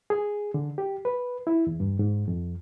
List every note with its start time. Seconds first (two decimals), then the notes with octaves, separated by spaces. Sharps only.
0.10 G#4
0.54 D3
0.78 G4
1.05 B4
1.47 E4
1.67 E2
1.80 G2
1.99 G#2
2.28 F2